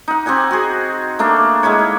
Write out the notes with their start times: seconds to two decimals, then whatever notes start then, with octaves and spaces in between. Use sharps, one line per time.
0.08 D#4 F#5
0.26 C4 G4 F#5 G#5
0.51 F#4 G#4
1.19 A3 A#3 D4
1.63 G#3 A#3 E4 C#5
1.79 D#4